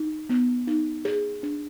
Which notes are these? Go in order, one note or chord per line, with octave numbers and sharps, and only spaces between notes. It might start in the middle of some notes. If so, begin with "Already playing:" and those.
Already playing: D#4
B3
D#4
G#4
D4